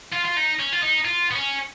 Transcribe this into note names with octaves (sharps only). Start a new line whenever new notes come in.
F4
F4
D#4
C#4
F4
D#4
F4
B3
C#4